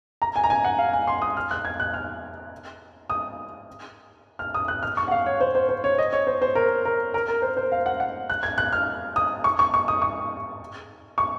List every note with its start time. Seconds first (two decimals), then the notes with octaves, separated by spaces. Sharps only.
0.22 A#5
0.36 G#5
0.44 A#5
0.50 G#5
0.65 F#5
0.78 F5
0.93 G#5
1.07 C6
1.22 D#6
1.37 F6
1.51 F#6
1.65 G#6
1.80 F#6
1.94 F6
3.10 D#6
4.39 F6
4.54 D#6
4.68 F#6
4.83 F6
4.97 C#6
5.08 F#5
5.11 F5
5.26 C#5
5.40 C5
5.55 C5
5.69 C5
5.84 C#5
5.98 D#5
6.13 C#5
6.27 C5
6.42 C5
6.55 A#4
6.85 A#4
7.14 A#4
7.28 A#4
7.42 C5
7.57 C5
7.72 F5
7.86 F#5
8.00 F#5
8.30 F#6
8.43 G#6
8.58 F#6
8.73 F6
9.16 D#6
9.44 C#6
9.59 C#6
9.74 C#6
9.88 D#6
10.02 C#6
11.18 C#6